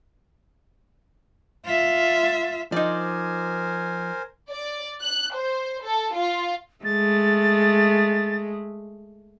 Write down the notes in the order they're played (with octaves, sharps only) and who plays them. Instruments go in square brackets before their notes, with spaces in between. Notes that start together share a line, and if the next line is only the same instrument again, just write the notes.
[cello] F4 E5
[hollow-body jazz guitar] F3 [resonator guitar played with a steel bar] D#4 D5 [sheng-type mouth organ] A#4 C5 G#5
[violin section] D5
F#6
C5
A4
F4
[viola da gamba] G#3 A3 [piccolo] A6